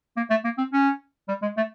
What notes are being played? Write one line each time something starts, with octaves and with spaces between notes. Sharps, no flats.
A#3
A3
A#3
C4
C#4
G3
G#3
A3